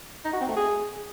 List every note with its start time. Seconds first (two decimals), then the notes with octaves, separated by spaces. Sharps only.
0.25 D#4
0.33 F#4
0.41 C4
0.49 A3
0.56 G#4